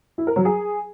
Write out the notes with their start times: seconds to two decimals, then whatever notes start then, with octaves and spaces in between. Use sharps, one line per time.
0.18 E4
0.27 A#4
0.36 F#3
0.45 G#4